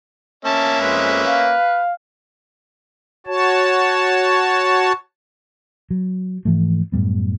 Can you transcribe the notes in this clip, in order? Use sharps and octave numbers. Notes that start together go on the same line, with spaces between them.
A#3 C#4 E5 A5
F2 G#3 B4
F5
F#4 C#5 A5
F#3
G#2 E3 F3 A3
F#2 A2 G3 B3